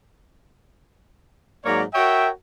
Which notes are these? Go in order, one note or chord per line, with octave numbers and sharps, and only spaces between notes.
G#2 F#3 A#3 C#5 D5 A#5
F#4 A#4 C#5 E5 G5